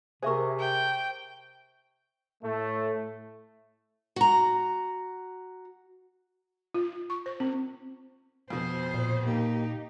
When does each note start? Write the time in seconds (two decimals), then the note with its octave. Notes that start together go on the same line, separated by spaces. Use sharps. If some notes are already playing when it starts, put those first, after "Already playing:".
0.23 C3 G#4 A#4 C5 E5 C#6
0.59 G5
2.44 A2 A3
4.16 F#4 A#5
6.74 F4
7.10 C#6
7.26 C5
7.40 C4
8.50 F2 B2 C5
8.94 A#2
9.25 A#3 D#4 G4